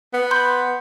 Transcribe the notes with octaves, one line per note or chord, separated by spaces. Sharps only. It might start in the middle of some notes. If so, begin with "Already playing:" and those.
B3
B5 C6 G6